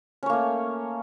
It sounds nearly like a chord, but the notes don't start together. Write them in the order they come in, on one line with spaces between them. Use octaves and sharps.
C#4 C#5 A#3 A3